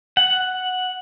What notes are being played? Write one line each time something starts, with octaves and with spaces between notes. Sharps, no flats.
F#5